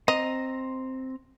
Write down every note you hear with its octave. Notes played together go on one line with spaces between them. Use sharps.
C4 D#5 A#5